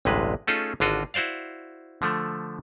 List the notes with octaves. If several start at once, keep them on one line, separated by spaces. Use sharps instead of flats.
A1 D2 G2 C3 G#3 B4
A3 C#4 D#4 F4 G#4 A4
G#1 D3 F4 F#4 D#5
E4 F#4 C5 D5 F5
D3 F3 A3